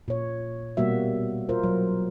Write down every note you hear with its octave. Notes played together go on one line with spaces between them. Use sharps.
A#2 C#5
B2 G3 A#3 F#4 E5
F4 A#4 C5
F#3